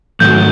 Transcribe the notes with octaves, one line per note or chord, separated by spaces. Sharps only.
G#2 D#3 F#3 A3 G6